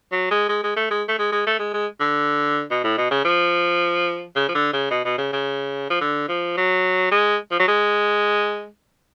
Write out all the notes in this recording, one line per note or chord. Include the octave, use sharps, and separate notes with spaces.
F#3
G#3
G#3
G#3
A3
G#3
A3
G#3
G#3
A3
G#3
G#3
D3
B2
A2
B2
C#3
F3
C#3
F3
D3
C#3
B2
B2
C#3
C#3
F3
D3
F3
F#3
G#3
F3
F#3
G#3